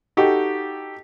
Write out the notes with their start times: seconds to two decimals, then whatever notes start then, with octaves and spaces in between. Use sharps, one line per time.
0.17 D#4 F#4 G4 A4